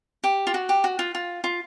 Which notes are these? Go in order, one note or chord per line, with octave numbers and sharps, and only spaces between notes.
G4
F4
F#4
G4
F#4
F4
F4
F4